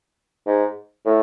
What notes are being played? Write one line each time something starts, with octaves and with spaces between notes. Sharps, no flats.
G#2
A2